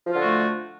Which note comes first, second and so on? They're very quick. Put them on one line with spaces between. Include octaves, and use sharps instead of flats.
F3 F4 D3 F#4 A3